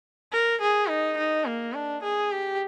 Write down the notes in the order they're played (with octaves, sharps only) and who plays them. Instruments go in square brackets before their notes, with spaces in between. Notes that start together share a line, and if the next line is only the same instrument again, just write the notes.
[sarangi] A#4
G#4
D#4
D#4
A#3
D4
G#4
G4